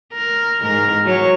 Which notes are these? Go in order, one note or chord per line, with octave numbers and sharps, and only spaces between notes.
A#4
G#2 A#4
F#3 C#5